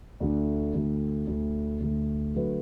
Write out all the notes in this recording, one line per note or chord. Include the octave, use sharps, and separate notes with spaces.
D2 D3 A3
D2 D3 A3
D2 D3 A3
D2 D3 A3
D3 F#3 A3 F#4 B4